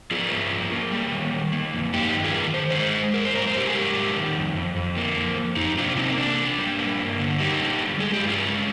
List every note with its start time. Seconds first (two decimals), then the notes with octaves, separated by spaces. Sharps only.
0.11 F3 F4 G#4
0.31 G2
0.51 F3
0.72 A#3
0.91 G3
1.12 D#3
1.33 D#3
1.52 A#3
1.73 F2
1.93 G2 D#4 G4
2.13 D#3
2.24 F4 G#4
2.34 D#3
2.53 D#3 C5
2.71 G#3 G#4 C5
2.94 G#3
3.14 G#2 A#4
3.25 C5
3.35 G3 A#4
3.47 C5
3.55 G#2 G4 A#4
3.68 G#4
3.75 G#2 G4 A#4
3.95 G3
4.16 D#3
4.36 F2
4.56 F2
4.76 F2
4.97 A#3
5.17 F2
5.37 F2
5.57 F2 D#4 G4
5.78 C3 D4 F4
5.97 A#3 C4 D#4
6.18 C3 D4
6.38 A#3
6.58 G3
6.79 A#3
6.98 G2
7.19 D3
7.40 A#3 D#4 G4
7.59 G3
7.80 D3
7.99 G#3 G#4
8.13 G4
8.20 G2
8.27 F4 G#4
8.41 G#3